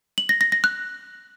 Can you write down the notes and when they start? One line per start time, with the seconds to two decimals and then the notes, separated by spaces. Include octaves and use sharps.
0.18 F#7
0.29 A#6
0.41 A#6
0.52 A#6
0.64 F#6